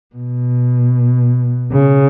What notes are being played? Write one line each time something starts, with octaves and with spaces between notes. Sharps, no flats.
B2
C#3